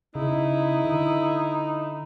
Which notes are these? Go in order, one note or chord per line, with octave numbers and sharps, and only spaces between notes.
C#3 D#4 E4
D3